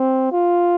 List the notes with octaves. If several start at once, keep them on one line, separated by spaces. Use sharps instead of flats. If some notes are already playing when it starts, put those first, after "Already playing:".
Already playing: C4
F4